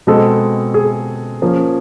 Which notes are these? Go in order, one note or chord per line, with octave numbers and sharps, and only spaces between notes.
B2 G#3 C4 A4
G#4
F3 A#3 C#4